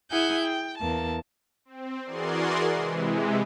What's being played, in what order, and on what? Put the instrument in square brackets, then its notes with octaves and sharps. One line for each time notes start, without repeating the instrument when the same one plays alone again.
[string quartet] E4 G#4 F#5 G#5 G6
G5
E2 A#3 A5
[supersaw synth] C4
E3 F#4 G#4 A#4 D5 C6
C3 E3 G#3